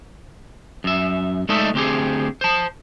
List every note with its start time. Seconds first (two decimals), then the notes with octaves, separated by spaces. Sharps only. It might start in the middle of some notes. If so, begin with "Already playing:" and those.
0.84 F#2 E5
1.49 G#3 A3 D#4 A4 D5 E5
1.74 D2 C4 G4 G#4
2.41 C5 A5